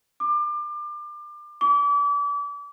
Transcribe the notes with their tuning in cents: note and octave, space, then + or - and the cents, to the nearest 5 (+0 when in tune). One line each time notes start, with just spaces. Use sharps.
D6 +30
D6 -35